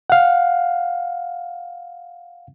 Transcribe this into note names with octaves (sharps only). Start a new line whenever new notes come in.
F5 F#5